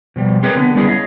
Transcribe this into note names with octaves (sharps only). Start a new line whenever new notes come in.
B2 F3 G3
C4 G4 G#4 A#4 B4 C#5
D3 B3
G3 B3 C#4 E4 G#4
C#5 D#5 F5